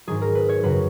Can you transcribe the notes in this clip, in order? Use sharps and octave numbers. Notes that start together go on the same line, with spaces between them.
G#2 D#3 F#3 G#4
A#4
B4
C#5
F#2 C#3 F#3 B4